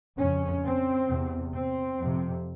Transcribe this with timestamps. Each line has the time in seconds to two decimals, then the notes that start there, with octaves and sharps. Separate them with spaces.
0.17 F2 C#3 C#4
0.63 C4
1.08 E2 C3
1.54 C4
1.99 F2 C3